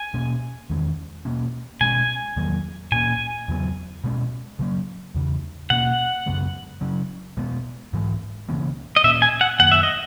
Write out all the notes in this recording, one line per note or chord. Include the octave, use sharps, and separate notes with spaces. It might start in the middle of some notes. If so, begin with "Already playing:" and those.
Already playing: G#5
B2 A#3 C#4
E2 D#3 G#3 C#4
B2 A#3 C#4
B2 G#3 C#4 G#5
E2 D#3 F#3 A#3
A#2 A#3 C#4 G#5
E2 C#3 F#3 B3
B2 G#3 C#4
C#3 F#3 A#3 C#4
E2 C#3 E3
B2 A#3 C#4 F#5
F#2 C#3 G#3 B3
C#3 F#3 C#4
B2 G#3 B3
G#2 E3 G#3
C#3 E3 A#3 C#4
D#5
A#2 A#3 C#4 E5
G#5
F#5
F#2 D#3 A#3 F#5
E5
D#5